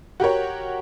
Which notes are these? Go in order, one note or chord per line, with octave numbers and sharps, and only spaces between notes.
F#4 G4 A#4 C#5